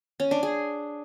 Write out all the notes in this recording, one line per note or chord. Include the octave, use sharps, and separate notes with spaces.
C#4
D4
G#4